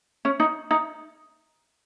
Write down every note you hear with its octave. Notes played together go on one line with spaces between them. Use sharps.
C#4
D#4
D#4